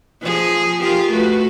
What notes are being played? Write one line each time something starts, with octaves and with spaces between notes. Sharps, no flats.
F3 G#4
F4 G4 A#4
A3 F#4 B4